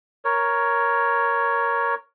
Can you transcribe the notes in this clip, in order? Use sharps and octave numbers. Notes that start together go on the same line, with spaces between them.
A#4 C#5